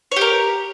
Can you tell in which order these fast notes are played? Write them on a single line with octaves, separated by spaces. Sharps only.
C#5 G4 A#4